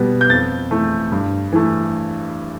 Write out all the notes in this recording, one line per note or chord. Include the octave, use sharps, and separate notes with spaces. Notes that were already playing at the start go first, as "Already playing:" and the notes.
Already playing: B2 G3 B3
G6
F2 A6
E3 A3
G2
E3 A3